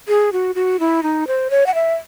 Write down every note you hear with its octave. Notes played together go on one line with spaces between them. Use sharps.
G#4
F#4
F#4
E4
D#4
C5
C#5
F#5
E5